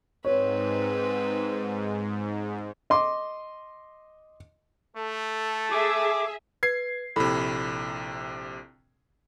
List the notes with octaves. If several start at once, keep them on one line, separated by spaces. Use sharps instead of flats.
G#2 C4 B4 C#5
D#5 C6 D6
A3 A4
G#4 E5 D6
B4 G#6 C7
A#1 C3 E4 A4 B5